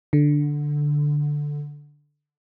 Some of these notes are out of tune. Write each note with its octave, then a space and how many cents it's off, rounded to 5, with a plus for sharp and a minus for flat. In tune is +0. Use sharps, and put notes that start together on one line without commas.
D3 +0